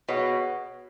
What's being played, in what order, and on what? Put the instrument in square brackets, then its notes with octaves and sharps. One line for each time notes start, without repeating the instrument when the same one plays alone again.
[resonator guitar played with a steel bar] B2 [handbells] G#4 C#5 F#5